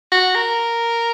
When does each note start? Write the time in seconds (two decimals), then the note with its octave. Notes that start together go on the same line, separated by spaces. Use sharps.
0.12 F#4
0.35 A#4